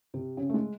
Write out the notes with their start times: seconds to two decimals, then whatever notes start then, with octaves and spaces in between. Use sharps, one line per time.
0.14 C3
0.37 C#3
0.49 A3
0.54 G#3